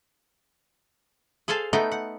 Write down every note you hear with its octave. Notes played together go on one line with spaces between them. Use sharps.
G#4 A4 C5 F5 A5
A3 B3 D#4 F#5 G5
F#5